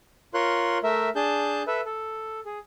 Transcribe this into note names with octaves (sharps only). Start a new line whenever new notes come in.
F4 A#4 C#5 C6 F#6
A3 A#4 E5
D4 G#4 A5 G6
A4 B4 E5
A4
G#4